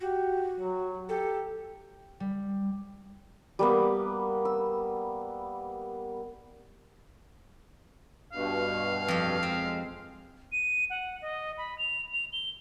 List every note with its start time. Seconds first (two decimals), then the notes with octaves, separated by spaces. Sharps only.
0.01 F#4 G4
0.60 F#3
1.09 G4 A4
2.20 G3
3.59 G3 A#3 B3
4.45 E6
8.33 G2 B2 F5
9.08 F2 G4
9.43 G#3 C4
10.52 D#7
10.90 F#5
11.22 D#5
11.58 B5
11.78 F7
12.13 F7
12.33 G7